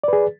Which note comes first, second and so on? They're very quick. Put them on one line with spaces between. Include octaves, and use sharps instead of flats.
D5 B4 G#4